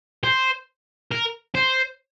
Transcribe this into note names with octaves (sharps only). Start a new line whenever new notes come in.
C5
A#4
C5